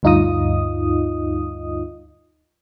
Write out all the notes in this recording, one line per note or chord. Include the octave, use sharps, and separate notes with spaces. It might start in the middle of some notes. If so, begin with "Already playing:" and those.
D2 G2 D#4 F4 D#5 D#6